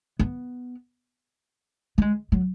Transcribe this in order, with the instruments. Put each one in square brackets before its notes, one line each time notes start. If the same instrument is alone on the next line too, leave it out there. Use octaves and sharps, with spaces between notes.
[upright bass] B3
A#3
G#3
F#3